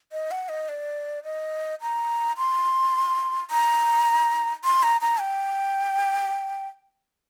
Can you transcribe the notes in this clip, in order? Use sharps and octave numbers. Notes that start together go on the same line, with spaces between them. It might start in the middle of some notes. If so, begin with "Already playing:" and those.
D#5
F#5
D#5
D5
D#5
A#5
C6
A#5
C6
A#5
A#5
G5